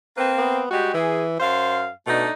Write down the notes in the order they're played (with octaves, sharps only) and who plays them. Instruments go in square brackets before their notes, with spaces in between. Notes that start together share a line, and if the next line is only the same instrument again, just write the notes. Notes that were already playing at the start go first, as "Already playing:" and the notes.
[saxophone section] A#3 C4 [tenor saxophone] B4
[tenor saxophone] B3
[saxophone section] G3 G#3 G4 [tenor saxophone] F#4
[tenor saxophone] E3 [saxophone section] G#4
[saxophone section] F#2 F5 [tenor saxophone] C5
[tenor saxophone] B2 [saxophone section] A3 D4 D#4